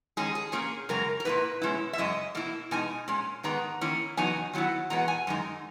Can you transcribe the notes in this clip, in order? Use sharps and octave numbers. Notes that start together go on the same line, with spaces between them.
D#3 G#3 C#4 G#4
G#4
A#2 A#3 C#4 G#4
F#2 C#3 G#3 A#4
A#4
A#2 A#3 E4 B4
B2 G#3 C#4 E4
E5
F#2 C#3 G#3 D#5
B2 A#3 E4
B2 G#3 D#4 G#5
A#2 G#3 C#4
G#2 D#3 G#3 B3 A#5
D#3 A#3 C#4 E4
E2 C#3 F#3 B3 D#4 G#5
D#3 F#3 B3 E4
E2 B2 G#3 B3 A#5
G#5
F#2 D#3 G#3 D#4